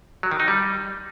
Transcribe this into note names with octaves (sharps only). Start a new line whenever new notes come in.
F#3
D#3
D#4
G3